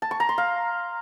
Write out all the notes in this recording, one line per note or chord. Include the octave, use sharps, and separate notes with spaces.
A5
C#6
A#5
C6
F5